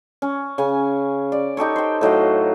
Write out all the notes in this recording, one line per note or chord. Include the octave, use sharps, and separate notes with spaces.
C#4
C#3 C#4 G#5
D5
D#4 G4 A4 C#5
C5 G5
A2 F#3 D#5 F5